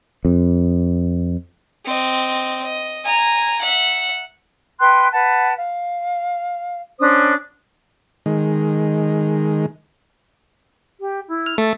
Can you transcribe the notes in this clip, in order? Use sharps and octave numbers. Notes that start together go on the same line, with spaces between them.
F2
C4 D#5
D#5
G#5 A#5
E5 F#5
B4 G5 C6 F#6
B4 F#5 A5
F5
C#4 D4 C5 D#6
D#3 G#3
G4
E4
F6
A3 A4